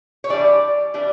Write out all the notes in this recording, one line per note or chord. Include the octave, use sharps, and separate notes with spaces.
C#5
E3 G3 D4 D5
E3 G3 D4